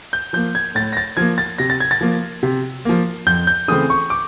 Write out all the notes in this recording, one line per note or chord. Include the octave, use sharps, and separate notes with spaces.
G6
F3 A#3 G6
G#6
A2 A6
A#6
A6
F3 A#3 G#6
A6
C3 A#6
A6
G#6
A6
F3 A#3
C3
F3 A#3
F2 G6
G6
C#3 E3 A3 C4 D#6
C#6
D6